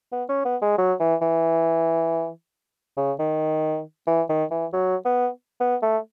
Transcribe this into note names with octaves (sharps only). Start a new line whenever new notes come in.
B3
C#4
B3
G#3
F#3
E3
E3
C#3
D#3
E3
D#3
E3
F#3
B3
B3
A3